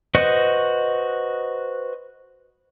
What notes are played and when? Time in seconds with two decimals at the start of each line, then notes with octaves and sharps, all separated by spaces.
0.15 F#4 B4 C5 D#5 C#6